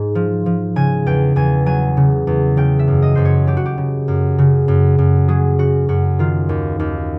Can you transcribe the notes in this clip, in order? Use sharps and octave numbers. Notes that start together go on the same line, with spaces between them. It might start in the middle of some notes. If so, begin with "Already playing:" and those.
Already playing: G#2
F3
F3
C#3 G#5
E2 G5
E2 G#5
F#3 G#5
C#3
E2
C#3 G5
E5
F#2
D#5
F#2 C5
C#5
F#3 G4
F#4
G4
C#3
F#2
C#3
F#2
F#2
F#3 G#4
C#3 F#4
F#2 F#4
D#3 F4
D#2
D#2